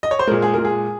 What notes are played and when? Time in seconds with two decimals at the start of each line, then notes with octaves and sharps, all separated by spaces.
0.03 D#5
0.11 C#5
0.19 C5
0.27 A#2 G#3 A#4
0.42 G#4
0.54 A#2 G#3 A#4
0.65 G#4